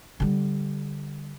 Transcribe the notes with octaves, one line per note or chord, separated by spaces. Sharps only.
D3 G3